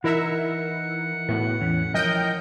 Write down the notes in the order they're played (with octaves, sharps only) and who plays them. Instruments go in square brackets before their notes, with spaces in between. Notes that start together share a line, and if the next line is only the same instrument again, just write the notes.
[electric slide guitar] E3 D#4 [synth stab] E4 A#4 E5 [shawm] F#5
[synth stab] A2 [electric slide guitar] B3 F#4
[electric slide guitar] E2 E3 C#4
[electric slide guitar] F3 E4 C#5 [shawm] A#4 [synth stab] D#5 G5 G6